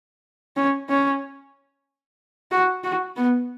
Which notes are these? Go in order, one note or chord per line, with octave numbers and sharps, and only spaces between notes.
C#4
C#4
F#4
F#4
B3